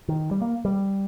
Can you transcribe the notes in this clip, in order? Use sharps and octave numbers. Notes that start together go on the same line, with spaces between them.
D#3
G3
A#3
G3